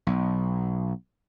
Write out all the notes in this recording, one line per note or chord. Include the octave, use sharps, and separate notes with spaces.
B1